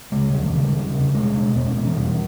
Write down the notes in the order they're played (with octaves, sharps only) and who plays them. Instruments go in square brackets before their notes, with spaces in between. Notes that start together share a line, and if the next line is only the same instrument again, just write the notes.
[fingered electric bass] C#3 G#3
D#2 G3
D#3
C#3 E3
G3
D#2
C#3
B2 G#3
B2
E2 B3
C#4
B2 B3
E3
E2 G3